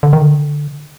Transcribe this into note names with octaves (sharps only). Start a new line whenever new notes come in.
D3
D#3
D3